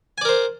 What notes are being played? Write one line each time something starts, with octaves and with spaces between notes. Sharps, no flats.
A#4 C5 D5 G#5